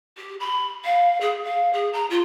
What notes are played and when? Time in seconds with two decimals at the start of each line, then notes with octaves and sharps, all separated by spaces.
0.17 G4
0.40 B5
0.84 F5
1.21 G#4
1.44 F5
1.73 G#4
1.93 A#5
2.10 F4